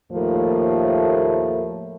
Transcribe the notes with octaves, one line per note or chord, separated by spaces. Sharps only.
D#2 A2 F3 A3 A#3